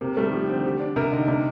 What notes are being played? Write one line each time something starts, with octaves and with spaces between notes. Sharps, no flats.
C3 A#3
G3 A3
D#3
F3 G4
D3 C4
G4
D4
C3 A#4
D3 D#4
C3 D4